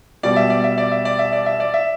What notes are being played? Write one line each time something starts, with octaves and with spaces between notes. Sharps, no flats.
B2 G3 D5
E5
D5
E5
D5
E5
D5
E5
D5
E5
D5
E5